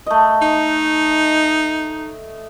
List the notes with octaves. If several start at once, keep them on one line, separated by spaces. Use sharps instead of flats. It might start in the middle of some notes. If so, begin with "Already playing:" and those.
A3 D#5
D#4